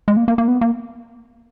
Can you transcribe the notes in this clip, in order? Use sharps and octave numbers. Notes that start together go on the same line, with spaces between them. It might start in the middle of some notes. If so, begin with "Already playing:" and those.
G#3
A#3
A#3
A#3
B3
A#3